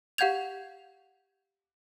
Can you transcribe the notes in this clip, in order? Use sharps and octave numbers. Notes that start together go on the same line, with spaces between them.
G4 F5 F#5 G6 G#6 F7